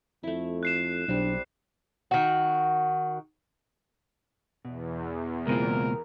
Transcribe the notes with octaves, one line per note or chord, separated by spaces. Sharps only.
F2 A3 E4
F#6 C7 E7
B1 G3 C4 D4
D#3 F#4
E2 B2
C#2 B2 G#3 A#3 C4 F4 A#4